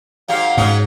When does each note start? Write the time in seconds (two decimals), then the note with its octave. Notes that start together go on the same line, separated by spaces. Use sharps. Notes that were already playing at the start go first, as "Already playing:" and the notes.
0.28 G#2 F#3 G4 F5
0.57 G#2 F#3 G#3 C#4